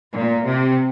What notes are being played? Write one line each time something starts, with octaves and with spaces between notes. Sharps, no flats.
A#2
C3